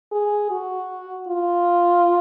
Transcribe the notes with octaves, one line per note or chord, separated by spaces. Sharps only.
G#4
F#4
F4